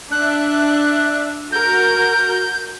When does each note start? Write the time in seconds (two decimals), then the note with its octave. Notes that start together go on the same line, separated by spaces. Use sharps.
0.12 D4 E5 F#6
1.52 F#4 A#4 G6